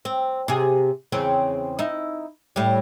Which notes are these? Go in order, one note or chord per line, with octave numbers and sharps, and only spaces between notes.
C4
C3 G#4
E2 C#3 C4
D#4 E4
A2 G3